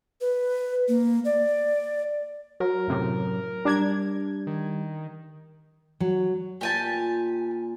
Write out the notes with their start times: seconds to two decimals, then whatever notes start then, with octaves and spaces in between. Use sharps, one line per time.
0.21 B4
0.88 A#3
1.25 D5
2.60 F#3 A#4
2.88 F#2 A2 C3
3.65 G3 D4 G#6
4.47 D#3
6.00 F#3
6.61 A#2 G4 G#5 A5